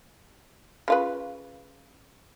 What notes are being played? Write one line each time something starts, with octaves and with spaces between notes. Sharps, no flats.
C#3 F4 B4